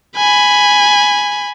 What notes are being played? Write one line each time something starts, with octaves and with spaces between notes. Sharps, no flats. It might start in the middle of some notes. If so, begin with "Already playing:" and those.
G#5 B5